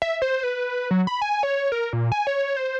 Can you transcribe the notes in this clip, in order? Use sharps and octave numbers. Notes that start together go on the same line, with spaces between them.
E5
C5
B4
F#3
B5
G#5
C#5
A#4
A#2
G#5
C#5
C5